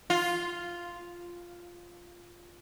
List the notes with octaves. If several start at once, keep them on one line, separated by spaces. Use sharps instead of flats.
F4